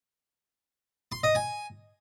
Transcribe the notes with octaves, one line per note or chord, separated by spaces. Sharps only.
C6
D#5
G#5